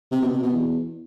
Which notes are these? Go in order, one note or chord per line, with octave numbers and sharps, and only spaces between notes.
C3
B2
C3
B2
E2